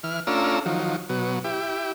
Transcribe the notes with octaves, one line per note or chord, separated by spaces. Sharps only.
E3 F6
A3 C#4 D4 F4 A#5 E6
D#3 F3 F#3
B2 F#3
E4 G4